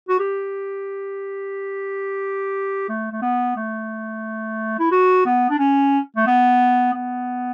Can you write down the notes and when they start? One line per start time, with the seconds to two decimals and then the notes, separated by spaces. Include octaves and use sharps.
0.09 F#4
0.20 G4
2.89 A3
3.12 A3
3.22 B3
3.56 A3
4.79 E4
4.91 F#4
5.26 B3
5.50 D4
5.58 C#4
6.16 A3
6.27 B3
6.93 B3